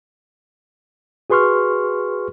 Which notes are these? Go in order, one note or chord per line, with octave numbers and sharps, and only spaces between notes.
F#4 G#4 B4 C6 C#6 F6